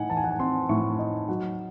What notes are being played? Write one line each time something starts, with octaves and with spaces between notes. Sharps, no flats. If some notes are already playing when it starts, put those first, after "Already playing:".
Already playing: A2 D#4 F#5 G#5
E3 A5
G#5
F#5
G#5
C4 C6
A2 C#6
D#4
F#3 F#5